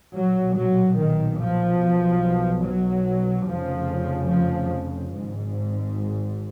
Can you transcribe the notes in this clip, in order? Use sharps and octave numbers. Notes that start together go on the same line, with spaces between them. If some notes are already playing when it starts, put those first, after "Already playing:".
B1 A#2 F#3
F#3
D#3
F3
B1 B2
F#3
F1 F2 C#3 F3
F3
G#1 G#2